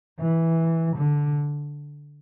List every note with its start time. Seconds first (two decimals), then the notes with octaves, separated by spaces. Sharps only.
0.20 E3
0.96 D3